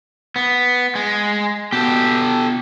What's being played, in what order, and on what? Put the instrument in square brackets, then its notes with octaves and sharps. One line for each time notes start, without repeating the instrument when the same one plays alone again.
[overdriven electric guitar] B3
G#3
[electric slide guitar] B2 [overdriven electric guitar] G4 A4